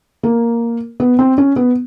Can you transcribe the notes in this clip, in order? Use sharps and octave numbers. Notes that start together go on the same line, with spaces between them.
A#3
B3
C4
C#4
B3